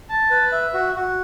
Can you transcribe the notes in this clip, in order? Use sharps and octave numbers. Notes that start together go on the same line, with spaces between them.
A5
B4
E5
F#4
F#4